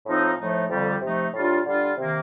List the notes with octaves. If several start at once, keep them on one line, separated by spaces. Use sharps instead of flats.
A2 F3 C4 D#4
A2 F3 A3 D#4
F2 D3 G3
C3 F3 A3 D#4
A2 G3 D4 F4
D3 G3 D4 F4
C3 D#3 A#3